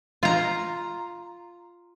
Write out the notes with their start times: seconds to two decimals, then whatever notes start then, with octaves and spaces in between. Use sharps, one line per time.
0.23 F4 A#5